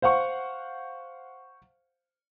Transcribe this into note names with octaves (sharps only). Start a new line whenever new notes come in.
C5 F5 F#5 C#6